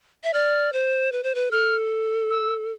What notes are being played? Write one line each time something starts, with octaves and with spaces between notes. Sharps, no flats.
E5
D5 F6
C5
B4
C5
B4
A4 F6
E6